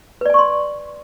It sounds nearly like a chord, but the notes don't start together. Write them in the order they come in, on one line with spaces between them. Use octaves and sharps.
B4 D5 G#5 C#6 C6